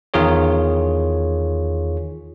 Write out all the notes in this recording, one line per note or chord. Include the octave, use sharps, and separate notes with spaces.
E2 D#3 F4 G#4 C#5